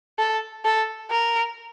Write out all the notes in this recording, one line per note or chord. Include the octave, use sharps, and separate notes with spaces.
A4
A4
A#4